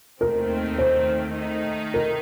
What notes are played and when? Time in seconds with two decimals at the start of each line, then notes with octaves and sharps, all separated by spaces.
0.21 D#2 D#3 A3 C4 A#4
0.78 C5
1.36 D#3 A3 D#4
1.94 A#4